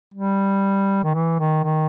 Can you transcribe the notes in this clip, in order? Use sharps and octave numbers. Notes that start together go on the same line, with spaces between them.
G3
D#3
E3
D#3
D#3